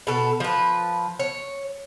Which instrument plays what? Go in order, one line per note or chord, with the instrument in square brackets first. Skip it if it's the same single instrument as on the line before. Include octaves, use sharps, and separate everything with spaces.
[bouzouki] B2 A4
F3 B4
C#5